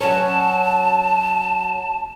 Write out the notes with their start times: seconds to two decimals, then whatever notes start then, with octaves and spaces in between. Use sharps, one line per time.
0.01 F#3 C#4 A5